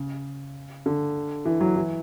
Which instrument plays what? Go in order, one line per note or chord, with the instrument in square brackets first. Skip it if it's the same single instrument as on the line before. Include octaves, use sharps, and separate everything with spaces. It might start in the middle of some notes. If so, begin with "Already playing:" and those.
Already playing: [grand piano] C#3
D3
E3
F#3
E3